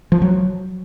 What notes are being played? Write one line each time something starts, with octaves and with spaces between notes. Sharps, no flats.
F3
F#3